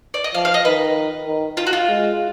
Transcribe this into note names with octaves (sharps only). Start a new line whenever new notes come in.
D5
D#5
F3 F5
F5
D#5
D#3 B4
D#3
F4
F#4
F4
G#3